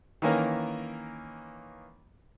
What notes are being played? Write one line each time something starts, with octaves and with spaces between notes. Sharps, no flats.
D#3 E3 A#3 C#4 A#4